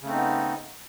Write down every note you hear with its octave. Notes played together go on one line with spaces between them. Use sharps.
C#3 A3 B3 C4 D#4